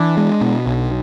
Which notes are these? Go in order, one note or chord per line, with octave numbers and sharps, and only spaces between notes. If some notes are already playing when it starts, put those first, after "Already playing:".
Already playing: E3 D4
G#3
B2
B1